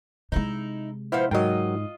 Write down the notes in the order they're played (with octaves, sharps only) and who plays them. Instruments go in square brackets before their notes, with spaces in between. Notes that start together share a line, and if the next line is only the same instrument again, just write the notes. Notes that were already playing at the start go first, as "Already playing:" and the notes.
[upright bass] C3 G#3 [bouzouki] D#4 E4
[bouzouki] F3 B3 C5 [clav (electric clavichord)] E4 F5 F#5
[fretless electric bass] G#2 [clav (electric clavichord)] F#3 A#4 G5 [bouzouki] F4 D#5